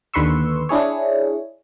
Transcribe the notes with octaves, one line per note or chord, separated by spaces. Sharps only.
D#2 D3 B4 C6 C#6 E6
D4 E4 G#4 C#5